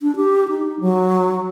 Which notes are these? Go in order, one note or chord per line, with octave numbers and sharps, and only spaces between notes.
D4
G4
D#4
F#3